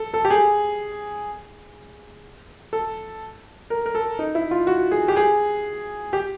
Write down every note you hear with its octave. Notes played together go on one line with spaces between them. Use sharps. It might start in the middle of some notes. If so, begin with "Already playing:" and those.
Already playing: A4
A4
G4
G#4
A4
A#4
A#4
A4
D#4
E4
F4
F#4
G#4
G4
G#4
G4